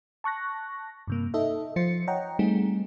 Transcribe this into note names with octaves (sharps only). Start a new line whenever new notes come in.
A5 C#6 F#6 A#6
G2 C3 A#3
D#4 A4 D#5 E5
F3 F4 C5 C#7
C#5 D#5 F#5 G5 A#5
G3 A3 C4 D#4 G#4